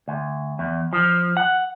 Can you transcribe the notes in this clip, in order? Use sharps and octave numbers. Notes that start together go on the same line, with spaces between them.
D2
E2
F3
F#5